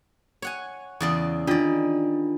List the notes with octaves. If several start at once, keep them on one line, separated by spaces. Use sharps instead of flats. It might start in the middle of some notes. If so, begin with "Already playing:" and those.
C#5 F#5 G#5
E2 C#3 D5
D#3 D4 F4 D5